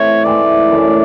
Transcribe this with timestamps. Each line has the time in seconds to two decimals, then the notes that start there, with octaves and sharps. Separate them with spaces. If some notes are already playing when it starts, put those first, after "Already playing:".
Already playing: E3 A3 C4 C#5
0.25 G#2 E3 A3 C4 D5
0.69 F#2 C#3 E3 A3